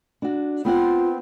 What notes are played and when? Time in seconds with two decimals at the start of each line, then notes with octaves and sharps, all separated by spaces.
0.22 D4 F#4
0.65 B3 C4 F4 F#5